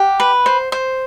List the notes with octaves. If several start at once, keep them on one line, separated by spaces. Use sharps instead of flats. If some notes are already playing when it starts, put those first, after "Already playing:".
Already playing: G4 F#5
B4
C5
C5